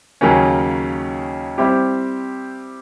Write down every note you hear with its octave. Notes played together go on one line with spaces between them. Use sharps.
D#2 C#3 F#3 A#3 C#4
G3 C4 E4 G4